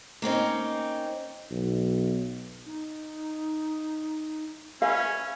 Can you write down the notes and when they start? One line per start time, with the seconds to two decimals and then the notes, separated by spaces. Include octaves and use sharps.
0.22 A#3 C4 C#4 D#4
1.51 B1
2.66 D#4
4.82 C#4 B4 E5 F5 G#5